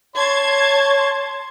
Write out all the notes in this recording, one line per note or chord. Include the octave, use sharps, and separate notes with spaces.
C#5 A5 C6 G#6